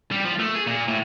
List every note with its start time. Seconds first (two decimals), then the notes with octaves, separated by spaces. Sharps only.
0.11 G3
0.25 F3
0.39 A3
0.55 G#4
0.67 A#2
0.88 A2